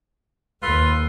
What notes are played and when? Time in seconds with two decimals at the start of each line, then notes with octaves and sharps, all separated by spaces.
0.63 D#2 F4 A4 B4